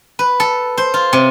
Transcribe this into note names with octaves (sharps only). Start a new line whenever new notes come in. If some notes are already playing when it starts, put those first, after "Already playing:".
B4
A4
C5
F4
C3